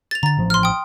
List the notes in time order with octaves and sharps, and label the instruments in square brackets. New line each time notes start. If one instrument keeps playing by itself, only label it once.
[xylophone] A6 F7
[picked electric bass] D3 [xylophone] A#5 A6
[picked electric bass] A1 F3
[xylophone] C6 F6
G5 D#6